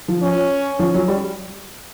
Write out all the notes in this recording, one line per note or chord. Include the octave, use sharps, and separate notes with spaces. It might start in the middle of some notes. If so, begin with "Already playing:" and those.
F3
C#4
F3 C#4
F#3
G3